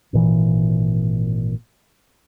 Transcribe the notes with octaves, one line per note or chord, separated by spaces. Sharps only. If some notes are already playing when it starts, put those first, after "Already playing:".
G#1 A#2 D3 E3